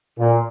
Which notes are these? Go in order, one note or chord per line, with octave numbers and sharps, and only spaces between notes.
A#2